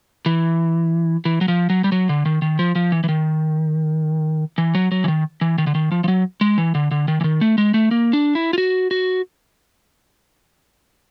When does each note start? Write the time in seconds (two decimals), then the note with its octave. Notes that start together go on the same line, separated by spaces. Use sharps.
0.26 E3
1.25 E3
1.41 F#3
1.48 F3
1.70 F#3
1.84 G3
1.92 F#3
2.09 D3
2.25 D#3
2.42 D#3
2.59 F3
2.75 F3
2.92 E3
3.04 E3
3.09 D#3
4.58 E3
4.75 F#3
4.92 F#3
5.04 E3
5.08 D#3
5.41 E3
5.58 D#3
5.67 D3
5.75 D#3
5.92 F3
6.04 F3
6.08 F#3
6.41 G#3
6.58 E3
6.75 D3
6.91 D3
7.08 D#3
7.21 E3
7.24 D#3
7.41 A3
7.58 G#3
7.74 A3
7.91 A#3
8.13 D4
8.35 E4
8.53 F4
8.58 F#4
8.91 F#4